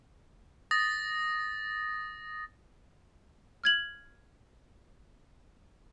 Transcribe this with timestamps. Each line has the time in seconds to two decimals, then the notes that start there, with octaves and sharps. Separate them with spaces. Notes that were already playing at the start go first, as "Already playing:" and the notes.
0.71 D#6 A6 A#6
3.64 F6 G#6 F#7